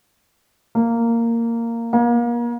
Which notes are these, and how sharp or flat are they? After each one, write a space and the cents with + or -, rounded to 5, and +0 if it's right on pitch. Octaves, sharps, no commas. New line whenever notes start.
A#3 -10
A#3 +35